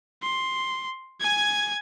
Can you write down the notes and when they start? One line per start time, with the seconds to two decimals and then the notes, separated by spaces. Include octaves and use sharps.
0.23 C6
1.20 G#5 G#6